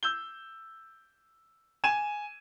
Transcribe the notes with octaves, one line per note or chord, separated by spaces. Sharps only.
E6 G6 G7
G#5 G#6 D#7 E7